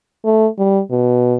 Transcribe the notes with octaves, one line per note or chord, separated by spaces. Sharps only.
A3
G3
B2